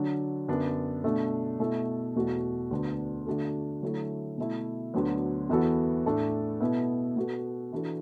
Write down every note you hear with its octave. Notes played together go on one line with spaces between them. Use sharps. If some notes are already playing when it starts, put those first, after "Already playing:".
Already playing: D3 F#3 D4 F#4
F#2 D3 B3 D4
B2 A3 D4 A4
B2 A3 E4 A4
E2 B2 A3 F#4 A4
D2 D3 B3 D4
D3 A3 D4 F#4 A4
D3 F#3 A3 E4 A4
B2 A3 E4
D2 D3 F#3 B3
E2 E3 B3 F#4 A4
A2 A3 D4 A4
B2 B3 E4 A4
B2 B3 F#4 A4
E3 D4 F#4 A4